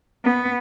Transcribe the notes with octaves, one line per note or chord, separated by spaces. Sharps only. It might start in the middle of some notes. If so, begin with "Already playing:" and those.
B3